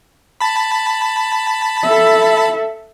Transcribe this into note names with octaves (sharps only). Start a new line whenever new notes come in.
A5 B5
A4 E5